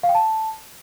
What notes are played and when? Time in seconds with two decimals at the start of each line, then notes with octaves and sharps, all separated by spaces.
0.03 F5
0.09 G5
0.15 A5